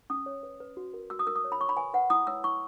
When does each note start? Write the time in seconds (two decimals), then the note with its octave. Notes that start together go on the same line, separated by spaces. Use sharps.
0.10 C#4 D#6
0.26 C#5
0.43 B4
0.60 B4
0.77 F#4
0.94 A#4
1.10 F#4 E6
1.19 D#6
1.27 A#4 E6
1.36 D#6
1.44 C#5
1.52 B5
1.60 C#5 C#6
1.69 B5
1.77 B4 G#5
1.94 B4 F#5
2.10 E4 D#6
2.27 C#5 E6
2.44 E4 C#6